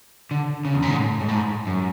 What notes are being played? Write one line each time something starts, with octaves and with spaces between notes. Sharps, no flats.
D3
C#3
E2
F#2
G#2
A2
G#2
A2
G#2
F#2